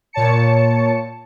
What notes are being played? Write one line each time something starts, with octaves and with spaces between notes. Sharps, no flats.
A#2 C#5 A5 C#7